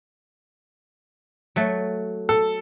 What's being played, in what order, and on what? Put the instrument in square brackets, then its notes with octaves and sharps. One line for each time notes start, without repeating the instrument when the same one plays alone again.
[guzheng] F#3 A3
[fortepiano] A4